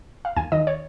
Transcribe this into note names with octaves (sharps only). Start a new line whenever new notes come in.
F5
D#2 G#5
D#3 D#5
C#5